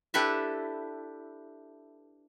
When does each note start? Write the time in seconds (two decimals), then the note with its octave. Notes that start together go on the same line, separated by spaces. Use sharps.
0.14 D4 E4 G4 A4 B4 E5